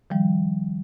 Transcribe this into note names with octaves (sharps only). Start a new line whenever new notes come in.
D#3 F3 G3